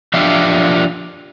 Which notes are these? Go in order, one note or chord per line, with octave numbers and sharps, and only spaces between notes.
F3 D4 G4 E5 F5